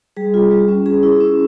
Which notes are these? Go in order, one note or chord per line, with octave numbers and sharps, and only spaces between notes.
G3 G#4
F4
G3
C#4
C#4 G#4
E4
C#4